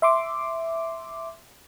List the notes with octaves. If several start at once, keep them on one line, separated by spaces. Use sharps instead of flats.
E5 C6 D6